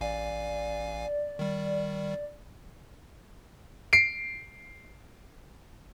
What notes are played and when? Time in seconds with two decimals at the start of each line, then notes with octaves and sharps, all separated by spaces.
0.01 A1 D5 F5 G#5
1.39 D#3 G3
3.93 C7 D7